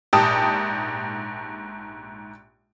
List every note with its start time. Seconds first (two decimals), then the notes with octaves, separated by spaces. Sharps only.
0.13 A#1 G#2 G4 G5 A5 D#6